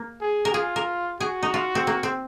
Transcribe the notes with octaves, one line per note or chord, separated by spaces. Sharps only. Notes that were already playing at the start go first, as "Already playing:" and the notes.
Already playing: A#3
G#4
A#4
F4 G#4
A#4
F#4 G#4
D#4
F4
C4
A#3
C4